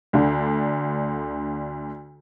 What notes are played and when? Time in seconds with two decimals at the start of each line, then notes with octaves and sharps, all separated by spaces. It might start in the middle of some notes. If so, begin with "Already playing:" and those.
0.13 D2 D3